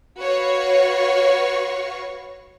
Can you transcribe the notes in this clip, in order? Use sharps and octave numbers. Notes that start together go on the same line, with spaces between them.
F#4 B4 C#5 F5 C#6